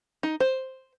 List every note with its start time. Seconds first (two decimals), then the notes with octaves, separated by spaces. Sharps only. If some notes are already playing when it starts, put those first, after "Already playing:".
0.23 D#4
0.40 C5